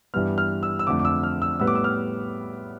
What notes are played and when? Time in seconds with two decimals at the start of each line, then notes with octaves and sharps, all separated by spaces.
0.14 G2 E3 G3 B3 F6
0.38 F6
0.63 E6
0.79 E6
0.87 F2 D3 A3 D6
0.99 D6
1.05 E6
1.23 F6
1.42 E6
1.60 A2 G3 B3 E6
1.67 D6
1.75 E6
1.84 F6